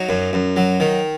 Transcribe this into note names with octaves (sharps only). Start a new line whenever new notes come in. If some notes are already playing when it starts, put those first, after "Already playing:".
Already playing: F#3 D#4 F#4
F#2
F#2
F#3
D#3